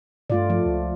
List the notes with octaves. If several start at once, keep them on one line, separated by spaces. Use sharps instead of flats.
G2 A3 F4 D5
F3 A3
C#2